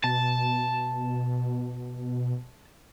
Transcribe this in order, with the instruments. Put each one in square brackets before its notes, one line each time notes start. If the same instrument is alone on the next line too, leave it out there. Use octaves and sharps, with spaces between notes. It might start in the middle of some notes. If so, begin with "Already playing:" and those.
[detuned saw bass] B2 [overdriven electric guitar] A5